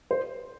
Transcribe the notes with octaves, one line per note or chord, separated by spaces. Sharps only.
C5